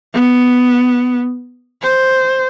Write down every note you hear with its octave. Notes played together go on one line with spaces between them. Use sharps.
B3
C5